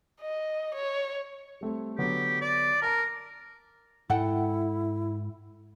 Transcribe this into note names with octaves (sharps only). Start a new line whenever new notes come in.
D#5
C#5
G3 A3 C4
D3 F#3 B3 G4
D5
A#4 A5 A#5
G#2 G#3 E4 A4 F#5 G5